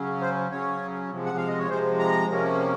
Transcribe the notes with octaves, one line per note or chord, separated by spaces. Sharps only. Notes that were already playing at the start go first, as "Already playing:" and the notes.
Already playing: C#3 F#3 C#4
C5
C#3 F#3 C#4 C#5
C3 F3 G#3
F#5
F5
D#5
C#5
C3 F3 G#3 C5
A#5
C3 F3 A#3 C#4